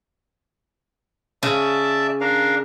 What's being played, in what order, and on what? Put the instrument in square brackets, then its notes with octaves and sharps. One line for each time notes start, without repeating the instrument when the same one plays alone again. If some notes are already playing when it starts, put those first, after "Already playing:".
[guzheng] C#3 [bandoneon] D5 E5 A5
[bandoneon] D4 A#4 F5